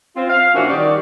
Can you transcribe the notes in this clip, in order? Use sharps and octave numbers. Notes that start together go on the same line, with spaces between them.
C4 F4
F5
A#2 E3 F3 C#4 D4 F#4
D#3 G3 F#4 G4 D5